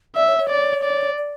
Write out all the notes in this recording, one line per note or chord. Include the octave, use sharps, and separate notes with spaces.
D5 E5
C#5
C#5
D5
D5
D5